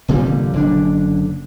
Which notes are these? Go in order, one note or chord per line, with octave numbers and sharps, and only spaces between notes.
F1 A#2 D3 G3
F#1 D3 D4